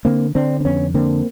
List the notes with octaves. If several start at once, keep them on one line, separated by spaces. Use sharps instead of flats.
D3 A#3 C4
D3 C4 D4
C4
F2 B3 C#4
D3 A#3 C4